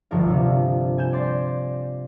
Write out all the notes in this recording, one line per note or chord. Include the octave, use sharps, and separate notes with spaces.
G1 D2 F3 D4 A#4 F5
C3 D4
G#5 G6 E7
D5 C6 A6 A#6 C7